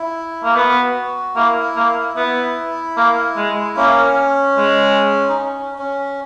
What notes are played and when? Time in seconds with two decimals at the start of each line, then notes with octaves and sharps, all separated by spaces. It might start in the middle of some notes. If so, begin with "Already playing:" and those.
Already playing: E4
0.43 A#3
0.56 B3 F#4
1.36 A#3 E4
1.76 A#3
2.17 B3 E4
2.97 A#3
3.37 G#3
3.77 A#3 C#4
4.57 G#3
5.28 D#4
5.38 C#4
5.78 C#4